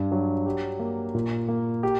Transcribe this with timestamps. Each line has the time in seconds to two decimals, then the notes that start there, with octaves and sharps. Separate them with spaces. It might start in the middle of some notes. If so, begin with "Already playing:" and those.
Already playing: G2
0.12 F#3
0.46 G4
0.79 A#3
1.15 A#2
1.48 A#3
1.83 G4